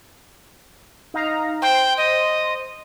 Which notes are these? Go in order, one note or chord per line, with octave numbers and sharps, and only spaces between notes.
D#4 F5 A#5
C5 G5
D#5